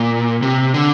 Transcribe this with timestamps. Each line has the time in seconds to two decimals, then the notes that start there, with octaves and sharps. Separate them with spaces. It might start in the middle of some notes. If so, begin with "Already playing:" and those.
Already playing: A#2
0.42 C3
0.74 D3